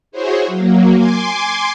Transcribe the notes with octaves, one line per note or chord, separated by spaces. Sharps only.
E4 F#4 G#4 C5 C#5
F#3 A#3
G#5 C6 D6